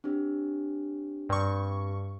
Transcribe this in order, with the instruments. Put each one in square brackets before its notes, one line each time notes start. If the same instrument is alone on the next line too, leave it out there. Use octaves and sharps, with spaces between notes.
[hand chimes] C4 D4 G4
[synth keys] G2 C#6